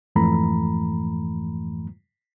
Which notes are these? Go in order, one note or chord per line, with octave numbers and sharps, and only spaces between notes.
F2 G#2 E3 A3 A#5 B5